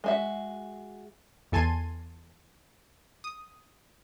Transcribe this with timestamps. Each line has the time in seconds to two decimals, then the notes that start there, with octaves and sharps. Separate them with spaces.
0.04 G#3 F#4 E5
1.52 E2 A4 G#5 A5 C6 D#7
3.24 D#6